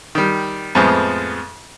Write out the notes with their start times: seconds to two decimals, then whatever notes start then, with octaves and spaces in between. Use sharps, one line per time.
0.15 D#3 G3
0.75 F2 A2 F3 G#3 B3 C5